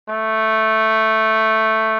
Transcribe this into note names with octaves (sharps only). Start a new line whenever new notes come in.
A3